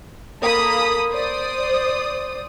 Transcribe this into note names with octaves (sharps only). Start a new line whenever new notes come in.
A#3 A4 B5 D#6
C5 D5 D#6